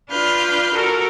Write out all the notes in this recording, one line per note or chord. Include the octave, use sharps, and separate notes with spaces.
D4 F4 B4 F6 G6
F#4 A4 A#4